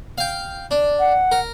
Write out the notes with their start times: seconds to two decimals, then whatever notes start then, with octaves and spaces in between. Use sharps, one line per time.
0.18 F5 G5
0.71 D4
1.00 F#5
1.32 A#4